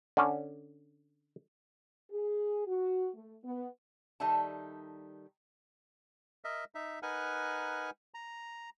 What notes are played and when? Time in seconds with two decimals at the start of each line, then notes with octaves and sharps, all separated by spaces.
0.17 D3 C#4
2.11 G#4
2.67 F#4
3.14 A3
3.44 B3
4.20 D#3 G3 D#4 A4 E5 A5
6.44 A#4 D#5 E5
6.75 D#4 E5
7.03 D#4 A#4 B4 F#5 G#5
8.14 A#5